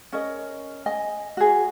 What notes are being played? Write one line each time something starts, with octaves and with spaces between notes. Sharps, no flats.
C#4 A#4 D#5
D#5 G#5
F#4 G#4